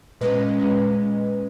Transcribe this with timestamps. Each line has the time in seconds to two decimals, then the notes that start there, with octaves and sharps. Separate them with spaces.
0.21 A#2 G#3 C#4 B4 D#5
0.58 A#2 G#3 C#4